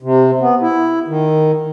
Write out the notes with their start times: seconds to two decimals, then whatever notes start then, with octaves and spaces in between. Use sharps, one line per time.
0.03 C3
0.41 B3
0.62 E4
1.08 D#3